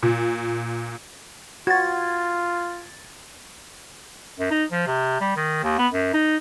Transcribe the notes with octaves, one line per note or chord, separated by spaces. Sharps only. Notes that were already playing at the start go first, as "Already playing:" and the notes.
A#2
F4 F#4 G#6 A6
F#2
D#4
F3
C3
G3
D#3
D#2
B3
F#2
D#4